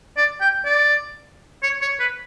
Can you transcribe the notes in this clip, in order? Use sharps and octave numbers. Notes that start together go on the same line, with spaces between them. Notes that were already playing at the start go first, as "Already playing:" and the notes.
D5
G5
D5
C#5
C#5
B4